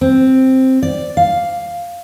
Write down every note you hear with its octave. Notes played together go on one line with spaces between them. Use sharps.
C4
D5
F5